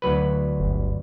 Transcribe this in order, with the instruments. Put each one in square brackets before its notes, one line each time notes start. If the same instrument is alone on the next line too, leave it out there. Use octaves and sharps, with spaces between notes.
[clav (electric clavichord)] D2 F#3 B4
[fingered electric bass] G1